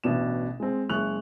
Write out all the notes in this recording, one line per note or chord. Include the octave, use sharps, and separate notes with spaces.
A1 B2 D4 E7
G#3 C4
F#1 G#3 C#6 F#6 F7